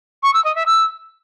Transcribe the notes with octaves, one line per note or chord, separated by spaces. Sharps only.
C#6
E6
D#5
E5
E6